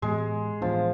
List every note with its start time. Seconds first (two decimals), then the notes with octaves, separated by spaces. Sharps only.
0.02 A2 E3 G#3 B3
0.61 A2 E3 F3 B3 D4